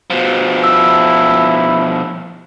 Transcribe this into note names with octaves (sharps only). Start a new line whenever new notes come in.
B2 F3
E4 E6